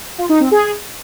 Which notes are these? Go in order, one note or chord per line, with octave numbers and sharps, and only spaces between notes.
F4
D#4
C4
G#4